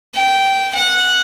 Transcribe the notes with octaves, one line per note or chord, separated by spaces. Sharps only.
G5
F#5